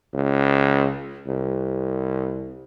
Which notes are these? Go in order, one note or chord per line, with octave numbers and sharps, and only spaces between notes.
C#2
C2